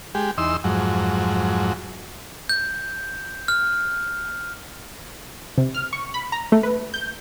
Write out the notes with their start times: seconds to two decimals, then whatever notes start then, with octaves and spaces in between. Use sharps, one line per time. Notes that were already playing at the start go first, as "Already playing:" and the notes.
0.15 G#3 G4
0.38 E2 D#4 C6 E6
0.64 F2 G#2 F#3
2.49 G6
3.48 F6
5.58 C3
5.74 F6
5.93 C#6
6.14 B5
6.32 A#5
6.52 A3
6.63 B4
6.94 G6